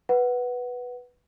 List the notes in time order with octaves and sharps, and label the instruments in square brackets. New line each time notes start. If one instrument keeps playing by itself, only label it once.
[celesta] B4 F#5